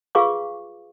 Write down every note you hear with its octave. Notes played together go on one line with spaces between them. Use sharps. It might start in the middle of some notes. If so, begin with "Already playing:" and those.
F4 G#4 B4 F5 C#6 D6